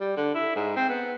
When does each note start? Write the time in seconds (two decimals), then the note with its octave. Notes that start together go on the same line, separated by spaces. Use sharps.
0.01 G3
0.17 D3
0.35 E4
0.56 G#2
0.76 C4
0.89 B3